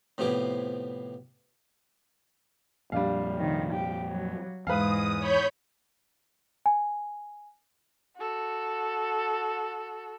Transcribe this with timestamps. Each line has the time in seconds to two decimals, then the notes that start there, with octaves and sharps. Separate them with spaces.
0.18 A2 C3 F3 B3 E4 G4
2.92 F2 A#2 G3 D4 F5
3.37 C3 D#3
3.73 G4
4.07 F#3
4.67 E2 G#2 G#3 B4 F5 D#6
5.19 C#5 B5 G6
6.66 G#5
8.17 F#4 A4